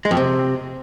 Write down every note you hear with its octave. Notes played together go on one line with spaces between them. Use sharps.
G#3
F2
C3